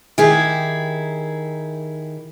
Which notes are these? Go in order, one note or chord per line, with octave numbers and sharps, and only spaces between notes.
D#3 E4 G4 G#4